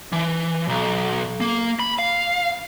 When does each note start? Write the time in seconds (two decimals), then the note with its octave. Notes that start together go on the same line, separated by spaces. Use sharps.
0.12 E3
0.69 B1
1.41 A#3
1.80 B5
1.99 F5